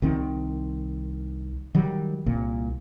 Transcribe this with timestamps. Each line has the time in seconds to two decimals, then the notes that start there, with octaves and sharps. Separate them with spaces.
0.02 C2 D#3 C4
1.75 D#3 F#3 G3
2.26 C2 A#2